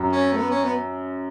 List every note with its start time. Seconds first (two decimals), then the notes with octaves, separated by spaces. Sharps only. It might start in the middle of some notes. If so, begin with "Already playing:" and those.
Already playing: F#2
0.12 C#4
0.33 A3
0.38 B3
0.51 C#4
0.64 B3